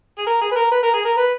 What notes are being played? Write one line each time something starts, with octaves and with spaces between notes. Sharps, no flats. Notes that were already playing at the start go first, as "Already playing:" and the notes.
G#4
A#4
G#4
B4
A#4
B4
A#4
G#4
A#4
B4